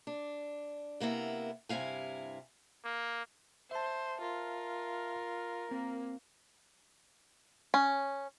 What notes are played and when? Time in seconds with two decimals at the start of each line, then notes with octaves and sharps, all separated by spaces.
0.07 D4
1.00 C3 A#3 B3 E4
1.69 G2 C3 E4 F5 G#5
2.85 A#3
3.71 C5 E5 A5
4.21 F4 A#4
5.71 A#3 C4
7.74 C#4